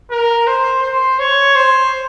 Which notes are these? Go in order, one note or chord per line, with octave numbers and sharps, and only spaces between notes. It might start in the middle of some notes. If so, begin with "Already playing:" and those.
A#4
C5
C5
C#5
C5